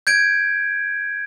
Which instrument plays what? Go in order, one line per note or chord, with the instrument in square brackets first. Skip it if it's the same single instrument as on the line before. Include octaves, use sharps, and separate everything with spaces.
[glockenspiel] G6 G#6 D7